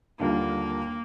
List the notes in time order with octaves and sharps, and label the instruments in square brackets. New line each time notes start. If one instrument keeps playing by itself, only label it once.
[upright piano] D#2 D3 G3 D4 F4 [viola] A#3